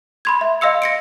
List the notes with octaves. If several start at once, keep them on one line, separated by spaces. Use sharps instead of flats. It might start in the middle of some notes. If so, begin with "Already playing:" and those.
B5 C6 G#6
E5
D#5 F5 C6 E6 C#7
A#6 C#7 D7